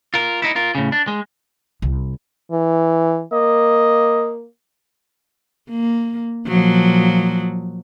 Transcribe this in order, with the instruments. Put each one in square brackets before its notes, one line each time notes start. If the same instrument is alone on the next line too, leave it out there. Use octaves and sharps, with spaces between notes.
[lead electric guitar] F4 A#4
D#4 E4
F4 A#4
A2 C#3
D4
G#3
[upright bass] C2
[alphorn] E3
[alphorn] A#3 [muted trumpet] D#5
[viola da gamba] A#3
A#2 F3 F#3